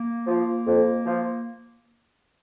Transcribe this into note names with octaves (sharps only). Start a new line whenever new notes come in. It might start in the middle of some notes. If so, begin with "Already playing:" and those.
Already playing: A#3
F3
F2
F3